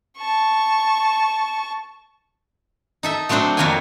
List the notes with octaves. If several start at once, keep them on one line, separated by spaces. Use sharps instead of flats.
A5 C#6
D#4 A4 E5
F#3 A3 C4 D4 C5
F2 F#3 A#3 F#4 G5 G#5